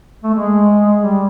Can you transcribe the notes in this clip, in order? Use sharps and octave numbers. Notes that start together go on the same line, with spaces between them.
A3
G#3
G3